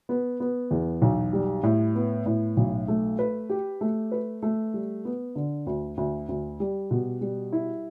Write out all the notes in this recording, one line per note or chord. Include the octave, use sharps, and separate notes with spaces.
B3
B3
E2
B1
G3
A2
B3
A2
B1
A3
B4
G4
A3
B4
A3
G3
B3
D3
D2
D2
D2
G3
B2
G3
E4